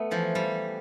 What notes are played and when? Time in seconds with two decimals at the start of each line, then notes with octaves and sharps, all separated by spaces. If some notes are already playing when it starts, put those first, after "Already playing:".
Already playing: A3 B3
0.11 E3 F3
0.35 G3